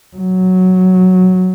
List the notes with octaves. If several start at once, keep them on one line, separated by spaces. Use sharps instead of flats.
F#3